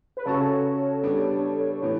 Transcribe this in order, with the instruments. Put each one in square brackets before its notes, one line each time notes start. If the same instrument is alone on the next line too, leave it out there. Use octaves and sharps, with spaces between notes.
[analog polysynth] B4
[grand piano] C#3 F#3 C#4 F#4 [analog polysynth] A4 C#5
[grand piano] G3 B3 D4
A2 E3 B3